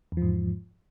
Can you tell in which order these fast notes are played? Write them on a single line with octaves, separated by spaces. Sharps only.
E2 F3 G#2